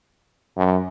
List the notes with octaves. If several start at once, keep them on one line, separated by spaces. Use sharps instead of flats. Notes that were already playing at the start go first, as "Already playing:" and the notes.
F#2